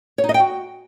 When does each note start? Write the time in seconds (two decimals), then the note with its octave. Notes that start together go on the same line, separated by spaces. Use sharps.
0.18 C#5
0.24 D#4
0.29 D#5
0.34 G5
0.40 F#4